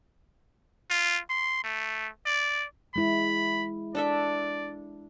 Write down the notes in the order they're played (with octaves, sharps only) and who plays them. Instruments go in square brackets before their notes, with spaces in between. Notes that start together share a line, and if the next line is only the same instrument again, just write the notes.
[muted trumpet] F4
C6
A3
D5
[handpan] G#3 E4 [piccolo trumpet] B5
[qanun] D4 A4 E5 [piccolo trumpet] D5